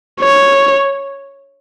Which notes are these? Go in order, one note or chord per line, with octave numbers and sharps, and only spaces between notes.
C#5